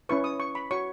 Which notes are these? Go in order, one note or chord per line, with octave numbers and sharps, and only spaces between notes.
C#4 E4 B4 C#6
D#6
C#6
B5
F#4 C#5 C#6